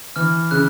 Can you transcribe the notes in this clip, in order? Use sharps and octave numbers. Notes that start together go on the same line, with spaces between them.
E3 F6
C#3 F#6